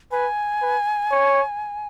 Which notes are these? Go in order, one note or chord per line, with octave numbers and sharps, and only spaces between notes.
B4 G#5
B4
C#5